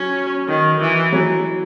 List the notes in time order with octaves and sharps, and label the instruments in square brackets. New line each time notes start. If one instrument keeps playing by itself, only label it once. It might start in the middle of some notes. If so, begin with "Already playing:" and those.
Already playing: [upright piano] F#3 [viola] C#4
[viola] D#3
E3
[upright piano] F#3